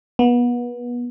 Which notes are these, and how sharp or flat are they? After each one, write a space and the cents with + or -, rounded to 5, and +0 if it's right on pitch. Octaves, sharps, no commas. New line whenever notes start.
B3 -30